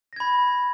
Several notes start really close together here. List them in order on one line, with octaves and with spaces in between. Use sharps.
A#6 G#6 B5